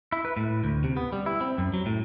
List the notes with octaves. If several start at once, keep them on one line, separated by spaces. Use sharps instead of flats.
E4
B4
A2
D2
C3
B3
G3
E4
C4
F#2
F#3
A2